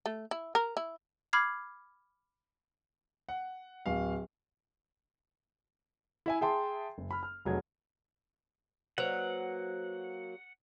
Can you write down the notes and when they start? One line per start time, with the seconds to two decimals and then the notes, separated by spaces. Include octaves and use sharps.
0.06 A3
0.31 E4
0.55 A#4
0.77 E4
1.33 B5 D6 F6 G#6 C7
3.29 F#5
3.86 D1 F5
6.26 E4 E5 G#5
6.41 G#4 E5 G5 A5 C6
6.98 F#1
7.11 B5 F6
7.23 F6
7.45 F1 F#3 G#4 G#6
8.98 F#3 A#3 B4 C5 F#5